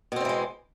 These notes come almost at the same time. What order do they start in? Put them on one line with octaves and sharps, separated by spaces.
B2 C4 D3 E3 G#3